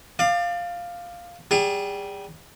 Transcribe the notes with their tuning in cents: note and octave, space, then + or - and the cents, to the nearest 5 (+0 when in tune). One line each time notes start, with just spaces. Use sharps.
D5 +30 F5 +0
G3 -25 G#4 -40